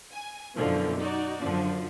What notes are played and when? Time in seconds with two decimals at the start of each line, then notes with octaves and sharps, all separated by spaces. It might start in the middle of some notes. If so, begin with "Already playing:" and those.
0.13 G#5
0.56 F#2 B2 D3 E3 F3
1.00 D#4 F#4 D5
1.40 F#2 D3 F3